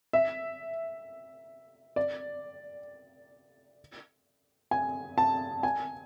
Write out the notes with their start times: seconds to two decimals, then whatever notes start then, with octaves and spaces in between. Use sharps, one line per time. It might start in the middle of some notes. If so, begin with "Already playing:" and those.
0.13 E5
1.96 D5
4.71 G#5
5.18 A5
5.63 G#5